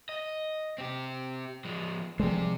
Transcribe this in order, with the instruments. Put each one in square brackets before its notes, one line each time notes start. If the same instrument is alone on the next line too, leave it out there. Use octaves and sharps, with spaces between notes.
[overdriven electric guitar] D#5
C4 G4
F3 G#3
[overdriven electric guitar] C3 G4 [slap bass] F3 G3 G#3